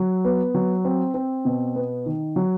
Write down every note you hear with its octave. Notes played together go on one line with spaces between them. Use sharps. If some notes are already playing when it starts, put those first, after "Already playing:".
Already playing: F#3
B3
F#3
C4
C4
B2
B3
D#3
F#3